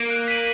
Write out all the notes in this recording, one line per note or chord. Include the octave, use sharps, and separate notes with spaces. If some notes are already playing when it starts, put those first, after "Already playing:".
Already playing: A#3
F#6
B6 D#7 F#7